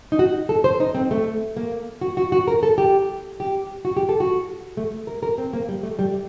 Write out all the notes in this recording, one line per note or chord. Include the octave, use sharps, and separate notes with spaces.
D#4
F#4
A4
C5
D#4
C4
A3
A#3
F#4
F#4
F#4
A#4
A4
G4
G4
F#4
G4
A4
F#4
A3
A#4
A#4
C4
A#3
G3
A3
G3